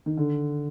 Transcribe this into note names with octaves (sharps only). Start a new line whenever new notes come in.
D#3
D3